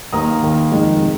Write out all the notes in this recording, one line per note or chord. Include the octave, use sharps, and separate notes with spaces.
D#2 D#3 A#3 A#5 D#6
D#2 D#3 A#3
F2 D#3 G#3 D#4
C3